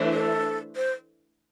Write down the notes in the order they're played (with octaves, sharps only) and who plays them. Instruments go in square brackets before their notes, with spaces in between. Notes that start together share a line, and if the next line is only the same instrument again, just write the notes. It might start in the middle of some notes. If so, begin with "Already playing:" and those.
Already playing: [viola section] E3 A3 D4 C5 E5
[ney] A4
C5